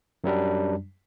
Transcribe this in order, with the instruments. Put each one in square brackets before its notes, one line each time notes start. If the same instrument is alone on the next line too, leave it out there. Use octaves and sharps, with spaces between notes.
[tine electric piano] F#2 F#3 G3 D4